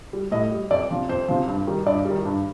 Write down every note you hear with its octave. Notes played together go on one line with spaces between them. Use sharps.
G3
A2 D#5
G3
F2 D5
C3 F3
F2 C5
C3 F3
G2
D#3 G3
G2 D5
D#3 G3
G2